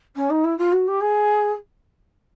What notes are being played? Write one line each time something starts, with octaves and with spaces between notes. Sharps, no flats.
C#4
D#4
E4
F4
F#4
G4
G#4